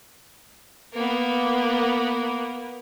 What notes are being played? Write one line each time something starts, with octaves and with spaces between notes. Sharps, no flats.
A#3 B3